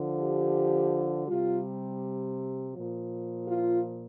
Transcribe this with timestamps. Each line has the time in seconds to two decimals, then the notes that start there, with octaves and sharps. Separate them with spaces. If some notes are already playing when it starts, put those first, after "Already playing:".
Already playing: D3 F3
0.17 G4
1.27 C3 G3 F4
2.75 A#2 F3
3.48 F4